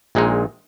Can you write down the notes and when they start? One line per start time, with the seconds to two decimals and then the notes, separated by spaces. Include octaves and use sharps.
0.15 A#1 A#2 G#3 D#4